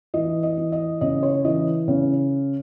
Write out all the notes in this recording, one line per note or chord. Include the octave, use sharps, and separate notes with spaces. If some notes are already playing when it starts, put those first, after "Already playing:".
E3 D#5
D#5
E3
D#5
C#3 D#5
C#5
E3 D#5
C#3